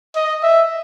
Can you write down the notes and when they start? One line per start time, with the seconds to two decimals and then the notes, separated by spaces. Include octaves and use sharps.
0.16 D#5
0.43 E5